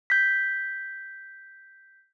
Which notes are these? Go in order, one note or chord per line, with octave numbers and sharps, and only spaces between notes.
G6 B6